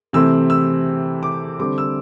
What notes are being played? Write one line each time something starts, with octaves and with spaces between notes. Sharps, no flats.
C3 E3 A3 C4 E6
E6
D6
D3 G3 C4 D6
E6